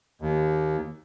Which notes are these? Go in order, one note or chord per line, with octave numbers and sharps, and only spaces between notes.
D#2